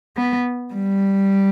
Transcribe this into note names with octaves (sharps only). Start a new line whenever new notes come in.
B3
G3